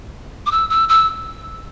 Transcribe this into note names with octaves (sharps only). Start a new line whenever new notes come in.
D6
E6
E6
E6